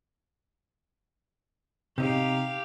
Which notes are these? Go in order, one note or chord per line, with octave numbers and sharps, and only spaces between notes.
C3 D#4 G4 F5